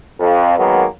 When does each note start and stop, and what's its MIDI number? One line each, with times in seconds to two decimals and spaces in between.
0.20 0.57 41
0.58 0.85 51
0.58 0.85 54
0.58 0.85 56
0.58 0.85 58
0.58 0.85 59